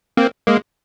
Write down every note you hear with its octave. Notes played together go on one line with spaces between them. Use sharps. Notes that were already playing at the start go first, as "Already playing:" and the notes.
A#3 C4
G#3 A#3